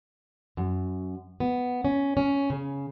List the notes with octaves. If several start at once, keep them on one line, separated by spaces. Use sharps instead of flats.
F#2
B3
C#4
C#4
C#3